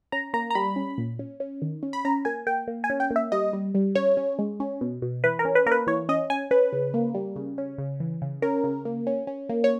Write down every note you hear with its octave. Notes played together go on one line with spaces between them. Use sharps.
C#4 A#5
A#3 A#5
A#5
G3 B5
C#4
A#2
C#4
C#4
D#3
C#4
B5
C#4 A#5
A#3 G#5
A#3 G5
A#3
G#5
C#4
G5
A#3
E5
G3 D#5
G3
G3
C#4 C#5
C#4
G#3
C#4
B2
B2
E3 B4
A#4
C#4
B4
A#3 A#4
B4
E3 C#5
C#4 D#5
C#4 G#5
C#4 B4
C#3
A#3
G3
C#3
C#4
C#3
E3
C#3
C#4 A#4
C#3
A#3
C#4
C#4
A#3
C#5